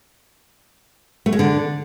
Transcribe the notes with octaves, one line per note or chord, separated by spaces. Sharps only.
A3
G#3
D3